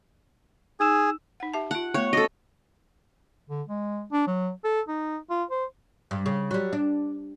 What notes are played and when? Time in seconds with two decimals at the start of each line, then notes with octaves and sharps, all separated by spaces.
0.80 D#4 G#4 E6 E7
1.40 D#4 F#5
1.54 G4 E5 A5
1.71 F4 F#5 A5
1.94 A3 B3 C#5
2.13 C#4 F#4 A4 D#5
3.50 D3
3.68 G#3
4.12 D4
4.27 F#3
4.64 A4
4.88 D#4
5.30 F4
5.51 C5
6.11 G2
6.26 C#3
6.51 F#3 G3
6.73 D4